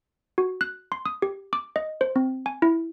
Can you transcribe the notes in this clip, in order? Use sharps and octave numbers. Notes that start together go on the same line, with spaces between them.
F#4
F#6
C6
D#6
G4
D6
D#5
C5
C4
G#5
E4